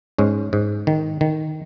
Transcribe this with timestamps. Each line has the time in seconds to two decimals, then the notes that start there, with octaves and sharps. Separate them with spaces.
0.18 G#2 G#3 C#4
0.53 G#2
0.87 D#3
1.21 D#3